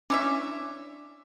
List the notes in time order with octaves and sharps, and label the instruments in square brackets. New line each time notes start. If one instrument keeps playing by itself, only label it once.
[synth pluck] C#4 [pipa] D4 E4 E5 [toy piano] D6